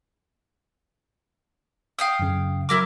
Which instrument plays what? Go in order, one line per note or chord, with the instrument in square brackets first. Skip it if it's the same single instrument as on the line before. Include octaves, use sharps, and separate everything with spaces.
[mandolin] F5 G5 D#6
[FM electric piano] F#2 C#3
[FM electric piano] F#3 F6 [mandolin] E4 A#4 D6